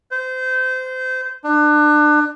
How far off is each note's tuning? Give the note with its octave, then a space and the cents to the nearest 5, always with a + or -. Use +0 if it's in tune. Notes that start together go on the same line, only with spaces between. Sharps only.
C5 -25
D4 +30